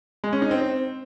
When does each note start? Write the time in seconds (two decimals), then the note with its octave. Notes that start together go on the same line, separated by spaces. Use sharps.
0.24 G#3
0.33 C#4
0.42 D#4
0.51 C4